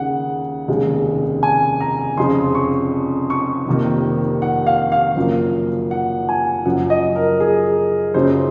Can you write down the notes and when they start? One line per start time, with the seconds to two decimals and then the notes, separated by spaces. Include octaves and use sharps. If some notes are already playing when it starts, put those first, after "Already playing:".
Already playing: D#2 C#3 G#3 F#5
0.68 F1 D#2 C#3 G#3
1.43 G#5
1.80 A#5
2.17 F1 F2 C#3 F3 C6
2.55 C#6
3.30 C#6
3.66 F1 F2 C3 D#3 A#3
4.42 F#5
4.67 F5
4.92 F5
5.16 F#1 F#2 F3 A#3
5.91 F#5
6.29 G#5
6.65 F#1 F#2 F3 F#5
6.90 D#5
7.16 A#4
7.40 G#4
8.14 F#1 F#2 C#3 F3 C5